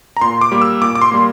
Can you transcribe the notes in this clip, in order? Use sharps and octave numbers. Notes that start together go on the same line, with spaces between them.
A#5
A#2 C6
D6
G3 A#3
E6
A#2 D6
D6
C6
G3 A#3